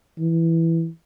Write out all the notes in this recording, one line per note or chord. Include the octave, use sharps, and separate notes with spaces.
E3